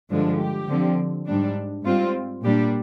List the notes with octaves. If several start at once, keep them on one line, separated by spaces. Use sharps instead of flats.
G2 D3 F3 G#3 D4
G4
D3 F3 C4
G#2 G3 D4
G#2 G3 C4 F4
A#2 G3 D4 G4